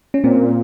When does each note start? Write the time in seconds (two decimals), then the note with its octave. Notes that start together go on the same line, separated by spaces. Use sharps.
0.14 C#4
0.24 A#2 C4